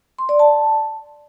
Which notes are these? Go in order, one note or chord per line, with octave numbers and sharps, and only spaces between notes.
C6
D5
A5